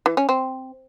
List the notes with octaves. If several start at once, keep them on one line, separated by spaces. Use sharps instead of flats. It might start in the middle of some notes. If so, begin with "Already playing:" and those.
E3
C#4
C4